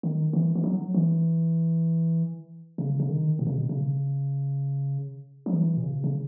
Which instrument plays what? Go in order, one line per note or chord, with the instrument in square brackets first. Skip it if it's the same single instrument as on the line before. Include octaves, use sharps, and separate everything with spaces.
[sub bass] D#3
E3
E3
F#3
E3
C#3
C#3
D#3
B2
C#3
B2
C#3
F#3
E3
B2
C#3
C#3